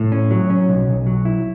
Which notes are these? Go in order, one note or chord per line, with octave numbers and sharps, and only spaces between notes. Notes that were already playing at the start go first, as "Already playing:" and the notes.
Already playing: A2
C#4
F#3
C#4
B1
B1
F#3
E4